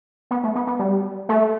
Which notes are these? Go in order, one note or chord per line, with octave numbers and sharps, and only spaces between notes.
B3
A3
B3
B3
G3
A3